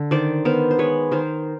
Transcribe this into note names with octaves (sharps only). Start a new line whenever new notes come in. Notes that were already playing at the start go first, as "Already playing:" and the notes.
Already playing: D3
D#3 C5 D5
B3 A#4 C5
C5
G#3 B4 C#5
D#3 A#4 C5